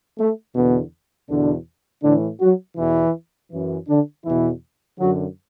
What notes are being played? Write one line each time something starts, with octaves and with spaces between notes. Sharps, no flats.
A3
E2 B2 D3 B3
E2 B2 D3 D4
A2 D3 E3 D4
F#3 F#4
E2 B2 E3 E4
F#2 E3
D3 D4
E2 E3 E4
B2
F#2 D3 F#3 F#4